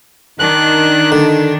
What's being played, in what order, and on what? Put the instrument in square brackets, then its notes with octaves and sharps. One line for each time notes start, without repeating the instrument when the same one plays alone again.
[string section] D#3 D4 [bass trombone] D#4 [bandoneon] F#6
[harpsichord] D3